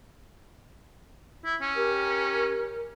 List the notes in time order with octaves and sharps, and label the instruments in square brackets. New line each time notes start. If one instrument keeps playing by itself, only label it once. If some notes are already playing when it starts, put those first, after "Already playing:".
[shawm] E4
C#4
[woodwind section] G4 A#4